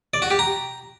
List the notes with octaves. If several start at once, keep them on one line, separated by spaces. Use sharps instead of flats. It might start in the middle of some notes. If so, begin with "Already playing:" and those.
D5
F#4
G4
A#5